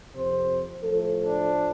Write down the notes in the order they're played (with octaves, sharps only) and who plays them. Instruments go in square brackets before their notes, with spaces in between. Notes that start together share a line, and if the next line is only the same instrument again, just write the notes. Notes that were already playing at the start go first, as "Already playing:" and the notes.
[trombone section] F2 C3 C5
[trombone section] A2 F3 A3 [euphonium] A4
[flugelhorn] D4